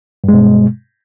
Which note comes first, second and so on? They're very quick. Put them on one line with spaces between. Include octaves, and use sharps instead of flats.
G2 G#3 B2